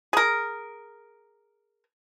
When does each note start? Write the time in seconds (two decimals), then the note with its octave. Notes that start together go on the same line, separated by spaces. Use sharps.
0.13 G#4 A#4